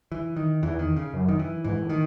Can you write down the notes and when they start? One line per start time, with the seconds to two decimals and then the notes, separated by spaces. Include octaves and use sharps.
0.12 E3
0.36 D#3
0.62 E2 E3
0.79 D#3
0.96 C#3
1.13 F#2
1.29 D#3
1.39 E3
1.64 G#2 E3
1.82 A2
1.89 D#3